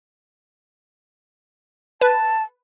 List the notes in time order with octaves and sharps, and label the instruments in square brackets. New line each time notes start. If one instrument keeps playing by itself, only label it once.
[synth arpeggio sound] B4 [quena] A5